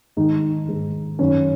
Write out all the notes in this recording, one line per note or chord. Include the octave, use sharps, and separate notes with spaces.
G#2 D#3 D#4
G#2 D#3
F#2 D#3 C#4